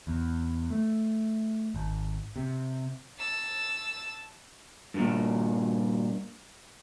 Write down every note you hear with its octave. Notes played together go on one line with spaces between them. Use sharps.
E2
A3
G#1
C3
A5 E6
G2 A#2